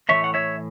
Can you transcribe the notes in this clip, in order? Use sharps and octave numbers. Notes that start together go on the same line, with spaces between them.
A2 E3 A3 C#5 E5
F#5
C#5 E5